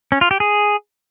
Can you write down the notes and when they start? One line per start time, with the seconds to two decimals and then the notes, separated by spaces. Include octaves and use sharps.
0.12 C#4
0.21 F4
0.31 G4
0.40 G#4